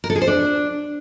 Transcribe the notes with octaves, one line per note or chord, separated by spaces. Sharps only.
A#4
A4
G#4
C5
D4